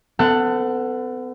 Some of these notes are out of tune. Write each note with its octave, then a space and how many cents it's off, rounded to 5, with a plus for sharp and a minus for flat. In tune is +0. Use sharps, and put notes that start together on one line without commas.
B3 +45 A4 +20 F#5 +0